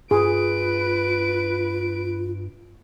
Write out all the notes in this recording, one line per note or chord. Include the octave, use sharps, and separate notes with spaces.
G2 F4 G#4 B4 D7